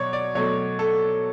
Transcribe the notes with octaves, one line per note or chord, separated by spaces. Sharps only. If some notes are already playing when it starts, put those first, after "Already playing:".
Already playing: B2 F#3 C#5 D5
D5
B2 F#3 A3 C#5
A4